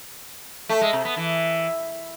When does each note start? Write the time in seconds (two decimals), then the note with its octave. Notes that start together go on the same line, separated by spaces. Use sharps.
0.69 A3
0.81 G#3
0.93 C3
1.05 B3
1.17 E3